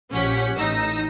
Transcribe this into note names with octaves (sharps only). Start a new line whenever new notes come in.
A#1 C#4 G4 F#5 B6
A1 D#4 E6 A#6